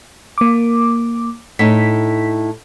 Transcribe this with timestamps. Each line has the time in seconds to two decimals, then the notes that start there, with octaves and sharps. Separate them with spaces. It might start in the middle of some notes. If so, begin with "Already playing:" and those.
0.38 A#3 D6
1.59 A2 D#4 B6